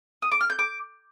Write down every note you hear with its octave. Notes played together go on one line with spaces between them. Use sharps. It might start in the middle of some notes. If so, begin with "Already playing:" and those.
D#6
D6
F6
G6
D6